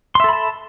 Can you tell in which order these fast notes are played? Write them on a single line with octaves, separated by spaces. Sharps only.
C6 E5 A4 B5 A5